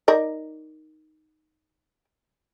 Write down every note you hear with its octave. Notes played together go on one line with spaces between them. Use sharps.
D#4 A#4 D5